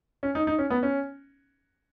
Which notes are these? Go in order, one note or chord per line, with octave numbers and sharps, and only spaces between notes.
C#4
D#4
D#4
C#4
B3
C#4